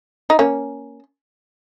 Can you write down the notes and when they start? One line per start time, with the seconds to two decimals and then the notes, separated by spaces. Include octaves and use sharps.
0.30 D#4
0.39 A#3 C#4